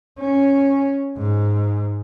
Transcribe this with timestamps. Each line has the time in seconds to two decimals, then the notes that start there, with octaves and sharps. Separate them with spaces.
0.19 C#4
1.17 G#2